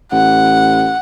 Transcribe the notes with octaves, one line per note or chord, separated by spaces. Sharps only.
A1 F#5